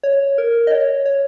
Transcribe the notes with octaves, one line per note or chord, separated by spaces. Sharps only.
C#5
A#4
D#5
C#5
C#5